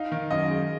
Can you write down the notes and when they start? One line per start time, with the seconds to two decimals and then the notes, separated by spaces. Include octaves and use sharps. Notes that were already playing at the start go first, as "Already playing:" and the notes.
Already playing: D#4 F5
0.12 D#3
0.31 F#2 D#5
0.50 G#3